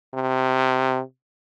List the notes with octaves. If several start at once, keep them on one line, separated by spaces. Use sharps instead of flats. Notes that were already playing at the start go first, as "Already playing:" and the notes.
C3